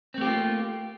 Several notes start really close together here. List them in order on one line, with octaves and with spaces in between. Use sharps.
C4 A3 G4 F4 A#3